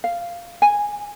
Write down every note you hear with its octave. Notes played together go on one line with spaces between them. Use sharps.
F5
G#5